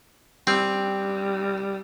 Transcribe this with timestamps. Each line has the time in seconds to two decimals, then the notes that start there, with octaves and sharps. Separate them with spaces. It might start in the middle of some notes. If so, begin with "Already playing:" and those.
0.47 G3 C4